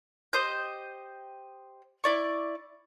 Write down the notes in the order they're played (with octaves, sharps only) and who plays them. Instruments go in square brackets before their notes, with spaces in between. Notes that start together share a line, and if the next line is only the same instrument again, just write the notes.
[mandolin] G4 C5 D#5 G6
E4 D5 C#6